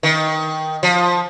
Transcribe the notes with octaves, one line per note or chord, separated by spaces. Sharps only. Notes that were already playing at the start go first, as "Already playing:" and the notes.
D#3
F3